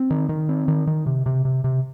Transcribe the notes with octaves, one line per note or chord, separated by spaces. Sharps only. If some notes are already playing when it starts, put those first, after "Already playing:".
Already playing: C4
D#3
D#3
C4
D#3
D#3
C3
C3
C3
C3